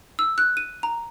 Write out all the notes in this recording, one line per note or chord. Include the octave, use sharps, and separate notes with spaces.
E6
F#6
D#7
A#5